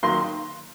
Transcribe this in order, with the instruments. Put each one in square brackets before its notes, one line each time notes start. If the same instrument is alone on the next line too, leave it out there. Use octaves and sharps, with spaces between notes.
[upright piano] D#3 F#3 A#3 C6